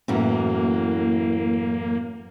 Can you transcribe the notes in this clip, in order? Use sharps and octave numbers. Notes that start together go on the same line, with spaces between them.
F#2 A2 E3 A#3